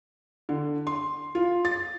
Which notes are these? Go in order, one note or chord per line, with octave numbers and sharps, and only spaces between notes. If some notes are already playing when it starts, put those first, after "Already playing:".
D3
C6
F4
A6